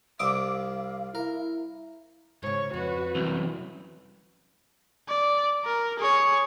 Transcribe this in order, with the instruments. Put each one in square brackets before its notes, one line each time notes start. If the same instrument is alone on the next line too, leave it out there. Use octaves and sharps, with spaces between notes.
[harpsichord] C2 E5 D#6 [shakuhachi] F5 [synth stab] D6
[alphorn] E4 [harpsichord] A#4
[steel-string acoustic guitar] G#2 C#3 [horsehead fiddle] C#5
[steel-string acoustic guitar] F2 [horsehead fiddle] F#4 B4
[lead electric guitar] C2 F#2 [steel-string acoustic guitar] E3
[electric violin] D5
A#4
G#4 C#5